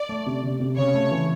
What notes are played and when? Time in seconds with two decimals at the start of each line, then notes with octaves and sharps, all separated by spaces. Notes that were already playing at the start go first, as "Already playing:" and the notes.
Already playing: D5
0.09 A3
0.26 C3
0.43 C3
0.60 C3
0.77 C#3 C#5
0.94 A3
1.11 E3